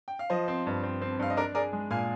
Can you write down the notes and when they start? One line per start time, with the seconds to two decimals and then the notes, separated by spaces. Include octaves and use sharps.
0.08 G5
0.19 F5
0.30 F3 C5 D#5
0.48 C4
0.67 G2
0.83 C4
1.02 C4
1.19 G2 F5
1.30 D#5
1.37 D4 A#4 D5
1.54 G#4 A#4 D5
1.73 G#3
1.91 A#2 F5 G#5